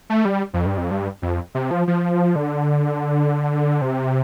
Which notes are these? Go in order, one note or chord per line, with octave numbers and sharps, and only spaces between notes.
A3
G3
F2
G2
F2
G2
F2
C3
F3
F3
D3
C3